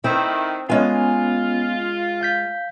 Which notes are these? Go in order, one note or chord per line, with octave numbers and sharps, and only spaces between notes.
D#3 C4 E4
G#3 B3 C#4 F4 G#5
F5 G6 B6